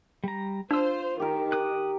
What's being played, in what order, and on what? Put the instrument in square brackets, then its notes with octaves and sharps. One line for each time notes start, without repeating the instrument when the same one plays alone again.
[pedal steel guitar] G3 A#5
[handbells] D4 E6 [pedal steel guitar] F4 [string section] C5
[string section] D#3 [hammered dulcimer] G4 A#4
[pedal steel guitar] D6 D#6 F#6